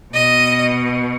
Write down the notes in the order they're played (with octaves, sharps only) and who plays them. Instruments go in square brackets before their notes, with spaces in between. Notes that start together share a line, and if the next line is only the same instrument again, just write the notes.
[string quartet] B2 D#5